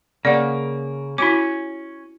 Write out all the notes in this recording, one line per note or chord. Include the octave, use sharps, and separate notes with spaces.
C#3 A#3 D5 F#5
C#4 E4 F#4 D6